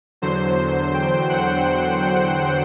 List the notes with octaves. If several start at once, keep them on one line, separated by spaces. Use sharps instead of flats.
E2 D3 F#3 C5
G5
F#5